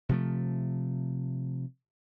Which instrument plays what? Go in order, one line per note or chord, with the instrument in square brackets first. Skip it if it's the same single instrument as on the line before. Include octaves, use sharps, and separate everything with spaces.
[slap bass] C3 F3 A3